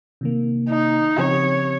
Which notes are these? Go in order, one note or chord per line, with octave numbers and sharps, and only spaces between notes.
C3 D#3 A#3
D#4
C#3 F3 C4 G4 C#5